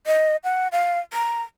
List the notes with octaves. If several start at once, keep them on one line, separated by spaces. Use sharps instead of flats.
D#5
F#5
F5
A#5